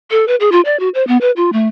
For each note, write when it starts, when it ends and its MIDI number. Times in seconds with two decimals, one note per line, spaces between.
0.11 0.25 69
0.28 0.36 71
0.40 0.50 68
0.52 0.61 65
0.65 0.78 74
0.80 0.89 66
0.94 1.06 72
1.07 1.17 59
1.21 1.31 71
1.36 1.50 65
1.53 1.68 57